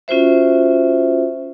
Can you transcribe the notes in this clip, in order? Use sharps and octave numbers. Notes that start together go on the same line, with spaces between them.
C#4 F4 F#4 C5 E5